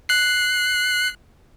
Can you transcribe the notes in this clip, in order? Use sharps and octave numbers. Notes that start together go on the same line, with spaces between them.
F#6 C7